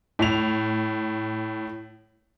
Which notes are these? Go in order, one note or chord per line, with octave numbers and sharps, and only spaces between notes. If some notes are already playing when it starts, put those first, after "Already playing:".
A2 F7